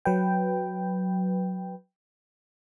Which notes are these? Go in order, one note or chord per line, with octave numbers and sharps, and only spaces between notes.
F#3 B4 G5